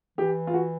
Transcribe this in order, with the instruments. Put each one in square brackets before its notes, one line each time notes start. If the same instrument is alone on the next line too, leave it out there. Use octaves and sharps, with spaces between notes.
[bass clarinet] E3 [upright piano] G4
[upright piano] F4
F#4